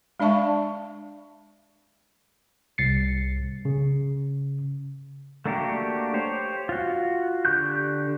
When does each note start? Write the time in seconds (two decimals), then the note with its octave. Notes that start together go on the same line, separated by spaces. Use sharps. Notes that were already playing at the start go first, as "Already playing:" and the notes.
0.20 G#3 D4 D5 E5 A5 C#6
2.78 C2 A6 C7 C#7
3.65 C#3
5.46 A3 A#3 D4 F#4 G4
6.14 G4 C5 C#5
6.69 F4 F#4
7.45 D3 G4 C#6 F#6 G6